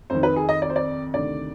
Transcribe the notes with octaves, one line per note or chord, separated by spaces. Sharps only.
F2 D#3 C5
B4
G#4
D#5
D5
C5
D5
D2 C3 D#3 D5